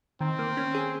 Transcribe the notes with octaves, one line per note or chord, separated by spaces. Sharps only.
D#3 C4
A#3
C#4
G#4